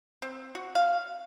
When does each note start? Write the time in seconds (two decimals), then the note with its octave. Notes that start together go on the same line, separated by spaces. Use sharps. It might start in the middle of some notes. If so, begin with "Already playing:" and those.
0.22 C4
0.55 F#4
0.75 F5